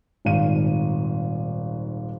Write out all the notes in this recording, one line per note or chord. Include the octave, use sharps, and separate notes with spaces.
D#1 G#1 G#2 F5 D#7